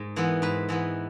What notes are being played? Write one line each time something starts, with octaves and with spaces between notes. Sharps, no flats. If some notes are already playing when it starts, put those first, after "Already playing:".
Already playing: G#2
E3 G#3 B3
G#2 B4
E3 G#3 B3